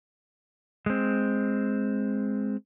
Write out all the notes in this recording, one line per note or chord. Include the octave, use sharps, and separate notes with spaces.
G#3 C4